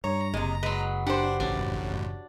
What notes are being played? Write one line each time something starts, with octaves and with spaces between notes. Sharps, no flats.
G2 C#5 A#5
F#1 C3 G#3
F#3 G#3 B4
D4 G4 C5 F#5
A1 F#2 D4